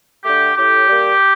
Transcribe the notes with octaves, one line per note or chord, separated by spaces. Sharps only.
D3 A3 G4
A2 G4
G3 A#3